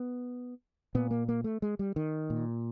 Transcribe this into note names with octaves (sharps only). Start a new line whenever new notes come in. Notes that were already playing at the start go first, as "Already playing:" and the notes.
Already playing: B3
A#2 B3
A#3
A#3
A3
G#3
G3
D#3
A#2